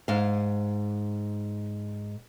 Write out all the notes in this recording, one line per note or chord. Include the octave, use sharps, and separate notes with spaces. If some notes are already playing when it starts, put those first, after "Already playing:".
G#2 F5